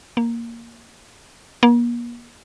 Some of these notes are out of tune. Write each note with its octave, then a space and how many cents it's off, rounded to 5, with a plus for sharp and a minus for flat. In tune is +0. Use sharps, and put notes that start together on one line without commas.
A#3 +0
A#3 +40